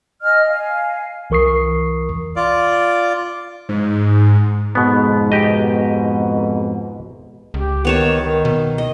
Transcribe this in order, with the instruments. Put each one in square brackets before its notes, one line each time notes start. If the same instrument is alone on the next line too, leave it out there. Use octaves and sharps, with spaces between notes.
[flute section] D#5 G#5 F6
F5 G#5
[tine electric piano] C2 E3 A#4 C#6 D#6 C7
[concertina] F4 D5
[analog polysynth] G#2
[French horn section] F2 G#2 [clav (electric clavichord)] B2 B3
[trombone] B2 [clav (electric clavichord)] G4 D#5
[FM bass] C#2 [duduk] G4
[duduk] D#3 [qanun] B3 C#5 A5
[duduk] D#3
[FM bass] B2
[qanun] D#5